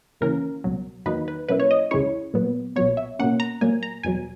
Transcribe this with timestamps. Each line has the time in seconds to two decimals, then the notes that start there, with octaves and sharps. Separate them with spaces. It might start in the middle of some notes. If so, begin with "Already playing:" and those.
0.21 D#2 C#3 E3 A#3 C#4 A#4
0.64 C#2 B2 F#3
1.06 E2 D#3 F#3 A#3 D#4 B4
1.28 B4
1.48 B2 F#3 A#3 C#4 E4 B4
1.60 C#5
1.71 D#5
1.91 C#2 C#3 G#3 C#4 E4 C#5
2.34 A#2 F#3 B3
2.76 B1 A#2 F#3 B3 C#5
2.97 E5
3.19 B2 A#3 C#4 F#5
3.40 A#5
3.61 A#2 F#3 A#3 G#5
3.83 A#5
4.03 E2 B2 F#3 G#5